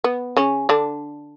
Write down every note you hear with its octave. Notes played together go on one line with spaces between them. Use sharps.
B3
C#3 C#4
D3 D4